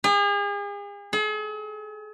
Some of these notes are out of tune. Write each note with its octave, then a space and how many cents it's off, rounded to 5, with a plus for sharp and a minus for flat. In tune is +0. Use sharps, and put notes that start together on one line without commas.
G#4 -40
G#4 +45